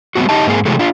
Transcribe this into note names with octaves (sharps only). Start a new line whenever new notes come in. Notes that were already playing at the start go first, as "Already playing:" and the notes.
G3 B3 C4 F#4
D#4 G4 D#5 A5
G#2 A#3 C4 G#4
C3 D#3 E3 F#3 G#3 A3
D4 F4